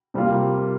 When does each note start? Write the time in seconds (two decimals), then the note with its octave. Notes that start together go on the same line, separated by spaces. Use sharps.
0.14 C3 G3 A#3 F4